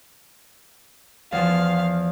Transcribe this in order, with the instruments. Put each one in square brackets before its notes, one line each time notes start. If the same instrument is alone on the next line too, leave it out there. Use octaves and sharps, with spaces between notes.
[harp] E2 F3 [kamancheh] F5